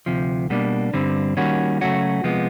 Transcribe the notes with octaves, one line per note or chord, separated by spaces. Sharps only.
D2 C3 F3
B2 G3 A#3 D4
G2 D3 G3 C4
D#3 G3 A#3 C#4 F#4
C#3 F#3 A3 C#4 F#4
C3 F3 G#3 B3